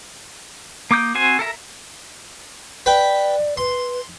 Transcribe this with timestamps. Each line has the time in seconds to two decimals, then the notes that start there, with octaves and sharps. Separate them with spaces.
0.91 A#3 D6 D#6 G6
1.15 C4 F#4 C5 G#5
1.39 A4 A#4 E5 A#5
2.86 B4 D5 G5
3.57 B4 C6